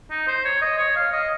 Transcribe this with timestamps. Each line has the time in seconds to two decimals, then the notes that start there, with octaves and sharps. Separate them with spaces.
0.10 D#4
0.28 C5
0.45 C#5
0.62 D#5
0.78 C#5
0.96 F5
1.12 D#5